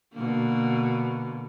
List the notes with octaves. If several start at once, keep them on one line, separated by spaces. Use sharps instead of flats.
B2 D3 A#3